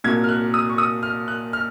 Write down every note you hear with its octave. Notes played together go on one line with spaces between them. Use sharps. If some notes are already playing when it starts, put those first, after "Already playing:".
C2 A#2 F#3 G#6
F6
F#6
D#6
C#6
D#6
F6
F#6
F6